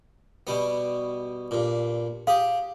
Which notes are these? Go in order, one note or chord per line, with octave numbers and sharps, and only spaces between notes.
B2 G3 B3
G2 A#2
G4 G#4 F5